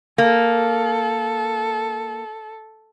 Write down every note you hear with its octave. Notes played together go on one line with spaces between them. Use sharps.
A#3 A4